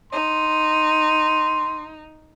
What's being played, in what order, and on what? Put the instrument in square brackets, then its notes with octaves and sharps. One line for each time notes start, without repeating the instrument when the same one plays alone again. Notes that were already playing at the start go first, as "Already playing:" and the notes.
[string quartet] D#4 [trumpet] C6